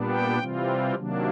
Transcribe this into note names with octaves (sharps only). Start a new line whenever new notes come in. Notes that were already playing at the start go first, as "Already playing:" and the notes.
Already playing: A#2 G3 B3 D4
G5
C3 E3 G3 C4 F4
C3 D#3 F#3 A#3 D4